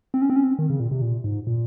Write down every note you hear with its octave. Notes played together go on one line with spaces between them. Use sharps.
C4
C#4
C4
C#4
C4
D#3
C#3
A#2
C3
A#2
G#2
A#2